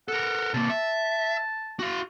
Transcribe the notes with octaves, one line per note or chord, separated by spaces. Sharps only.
A4 A#4 F#5
C3 A#3 A5
E5
F#4 F5